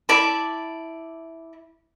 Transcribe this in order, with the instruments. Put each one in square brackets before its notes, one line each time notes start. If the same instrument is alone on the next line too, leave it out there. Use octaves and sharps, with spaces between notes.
[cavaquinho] E4 D5 A5 B5